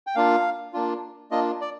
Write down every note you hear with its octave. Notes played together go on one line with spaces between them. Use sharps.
G5
A#3 D4 F4 F5
A#3 D4 F4
A#3 D4 F4 D#5
D5